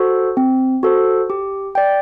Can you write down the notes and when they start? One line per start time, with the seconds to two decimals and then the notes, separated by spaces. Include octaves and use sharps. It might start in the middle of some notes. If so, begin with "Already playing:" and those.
Already playing: F#4 A4 C5
0.37 C4
0.83 F#4 A4 C5
1.30 G4
1.75 D5 G5